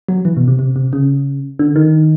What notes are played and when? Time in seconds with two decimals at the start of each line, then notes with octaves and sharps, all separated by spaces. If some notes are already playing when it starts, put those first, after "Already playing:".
0.09 F#3
0.25 E3
0.37 B2
0.48 C3
0.59 C3
0.76 C3
0.93 C#3
1.59 D3
1.76 D#3